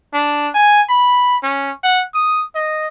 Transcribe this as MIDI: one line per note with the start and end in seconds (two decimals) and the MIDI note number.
0.14 0.49 62
0.55 0.82 80
0.89 1.37 83
1.43 1.71 61
1.84 2.04 78
2.15 2.44 87
2.55 2.87 75